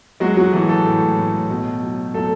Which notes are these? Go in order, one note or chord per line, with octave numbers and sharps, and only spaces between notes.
F#3 G#3 F#4
F#3 F#4
E3 A3 A4
A3 A4
A2
A2
B2
F#3
F#3 A3 A4